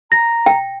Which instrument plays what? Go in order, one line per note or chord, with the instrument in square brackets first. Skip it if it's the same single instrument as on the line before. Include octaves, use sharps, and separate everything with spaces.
[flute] A#5 [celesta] A#6
[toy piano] G5